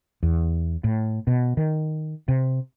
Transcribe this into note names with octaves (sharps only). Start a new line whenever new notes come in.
E2
A2
B2
D#3
C3